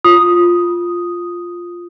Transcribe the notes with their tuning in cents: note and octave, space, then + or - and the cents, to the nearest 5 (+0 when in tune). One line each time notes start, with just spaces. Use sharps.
F4 +0 D#6 +0